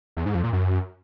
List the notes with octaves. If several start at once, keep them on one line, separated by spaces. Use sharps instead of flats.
E2
G#2
F2
A#2
F#2